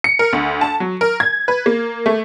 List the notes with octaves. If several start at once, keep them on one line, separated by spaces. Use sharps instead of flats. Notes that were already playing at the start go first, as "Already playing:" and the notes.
C#7
A#4
D2
A5
F#3
A#4
G#6
B4
A#3
A3